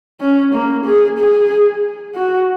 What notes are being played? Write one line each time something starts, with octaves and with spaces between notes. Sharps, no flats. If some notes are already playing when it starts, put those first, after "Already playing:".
C#4
A#3
G#4
G#4
F#4